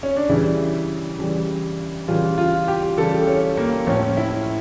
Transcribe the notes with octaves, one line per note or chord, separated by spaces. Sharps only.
C#4
D4
C#3 E3 G3 E4
C#3 E3 G3
C#3 E3 G3 F4
F4
G4
C#3 E3 G3 A4
C#4
A#3
A2 F3 C#4
E4